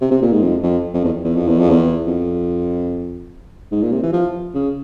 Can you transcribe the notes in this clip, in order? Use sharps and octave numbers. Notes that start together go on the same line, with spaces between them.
C3
C3
A#2
G#2
F2
F2
F2
E2
E2
F2
E2
F2
E2
F2
G#2
A#2
C3
E3
F3
C#3